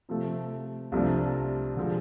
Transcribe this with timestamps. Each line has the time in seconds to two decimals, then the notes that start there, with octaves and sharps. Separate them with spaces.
0.09 C3 F3 A3
0.92 C2 C3 F3 A3 D4
1.76 D3 F3 G#3